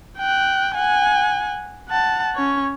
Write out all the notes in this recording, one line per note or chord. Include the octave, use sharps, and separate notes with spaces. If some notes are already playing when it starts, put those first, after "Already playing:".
G5 F#6
F#5 G#5
F#5 A5
C#4 C#5